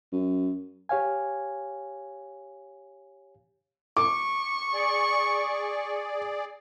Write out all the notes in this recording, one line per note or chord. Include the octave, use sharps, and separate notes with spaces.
F#2
G4 C#5 F5 G#5
C#6 D6
G#4 D5